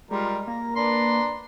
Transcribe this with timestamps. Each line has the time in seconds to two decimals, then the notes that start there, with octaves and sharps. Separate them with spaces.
0.11 G3 G#3 F4 A#4
0.48 A#3 A#5
0.76 D4 B4 A#5 C6